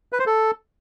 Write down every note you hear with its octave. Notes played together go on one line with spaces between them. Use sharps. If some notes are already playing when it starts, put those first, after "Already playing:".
B4
C5
A4